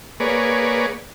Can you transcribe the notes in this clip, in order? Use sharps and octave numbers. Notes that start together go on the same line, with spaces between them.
A#3 G#4 B4 C#5 D5